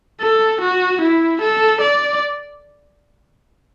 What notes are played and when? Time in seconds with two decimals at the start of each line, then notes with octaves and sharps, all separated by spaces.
0.21 A4
0.61 F#4
1.01 E4
1.41 A4
1.81 D5